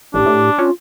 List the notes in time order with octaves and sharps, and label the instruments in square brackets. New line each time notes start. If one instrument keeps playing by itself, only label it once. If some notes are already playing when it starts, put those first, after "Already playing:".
[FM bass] A1 [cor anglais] D4 [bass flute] G4
[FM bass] A2
[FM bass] C#4 [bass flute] F4